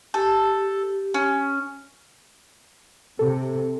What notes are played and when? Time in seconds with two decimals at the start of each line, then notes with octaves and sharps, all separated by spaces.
0.14 G4 A4
1.14 C#4
3.19 C3 A4